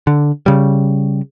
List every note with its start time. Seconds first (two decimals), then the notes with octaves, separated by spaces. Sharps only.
0.07 D3
0.46 C#3 G3